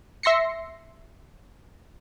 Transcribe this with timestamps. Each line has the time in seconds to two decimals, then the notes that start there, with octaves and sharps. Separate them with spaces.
0.23 E5 C6 A#6 C7 C#7